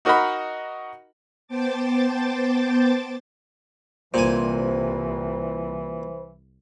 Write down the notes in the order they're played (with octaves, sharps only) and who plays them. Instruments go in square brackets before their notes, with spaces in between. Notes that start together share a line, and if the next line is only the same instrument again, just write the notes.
[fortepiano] D#4 F#4 A#4 D#5 F#5 B5
[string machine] B3 C5 G5 A5 D6 A6
[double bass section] C2 [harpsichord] A#2 G#5 [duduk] E3 [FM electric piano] C5